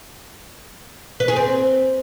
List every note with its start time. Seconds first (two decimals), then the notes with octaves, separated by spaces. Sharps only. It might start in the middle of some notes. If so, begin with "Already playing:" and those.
1.20 B4
1.28 G#4
1.36 C4